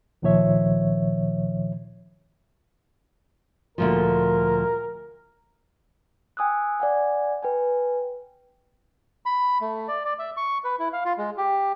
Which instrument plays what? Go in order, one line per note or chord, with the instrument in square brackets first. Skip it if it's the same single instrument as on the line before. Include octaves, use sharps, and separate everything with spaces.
[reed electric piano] C#2 A#2 D#3 F3 C#5 E5
[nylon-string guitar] D2 A#2 F3 [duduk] A#4
[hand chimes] G5 G#5 D#6 E6 F#6
D5 F#5 G#5
B4 G5 G#5
[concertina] B5
A3
D5
D5
E5
C#6
B4
E4
F5
F4
G#3
G4